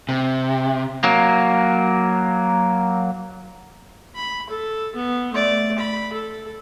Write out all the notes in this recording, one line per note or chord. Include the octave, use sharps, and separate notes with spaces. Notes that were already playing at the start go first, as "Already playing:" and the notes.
C3
F#3 A#3
B5
A4
B3
A3 D5
B5
A4